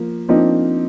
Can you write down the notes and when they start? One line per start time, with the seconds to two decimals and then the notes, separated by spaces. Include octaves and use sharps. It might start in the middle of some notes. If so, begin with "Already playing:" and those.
Already playing: F3 A#3
0.29 F3 A#3 C4 D4 D#4